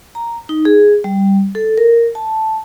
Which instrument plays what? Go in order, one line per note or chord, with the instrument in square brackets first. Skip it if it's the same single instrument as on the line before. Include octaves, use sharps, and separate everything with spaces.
[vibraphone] A#5
D#4
G#4
G3
A4
A#4
A5